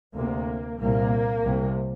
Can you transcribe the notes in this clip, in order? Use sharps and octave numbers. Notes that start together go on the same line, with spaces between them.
D2 C3 A#3
C2 A#2 A#3
C2 C3